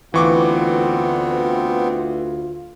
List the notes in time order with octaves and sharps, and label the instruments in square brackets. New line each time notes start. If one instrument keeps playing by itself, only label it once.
[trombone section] D2 F4 [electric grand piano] E3 C#6 D6 [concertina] B3 C4